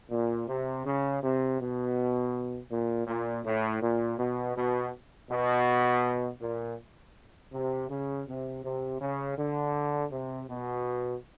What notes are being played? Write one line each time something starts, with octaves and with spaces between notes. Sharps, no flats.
A#2
C3
C#3
C3
B2
A#2
A#2
A2
A#2
B2
B2
B2
A#2
C3
C#3
C3
C3
C#3
D3
C3
B2